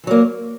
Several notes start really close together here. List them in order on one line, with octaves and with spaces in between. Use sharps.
E3 F#3 A#3